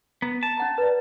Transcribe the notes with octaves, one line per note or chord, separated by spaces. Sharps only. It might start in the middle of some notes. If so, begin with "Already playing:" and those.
B3 A#5
A5
C#4 F#5 A#5
B4 D5